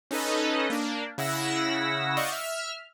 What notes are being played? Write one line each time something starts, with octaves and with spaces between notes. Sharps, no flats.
C#4 D#4 A4 B4 D#5
A#3 D4
C#3 E4 F#5 E6 A#6
D5 D#5 F5 F#5 C#6 G6
E5 F6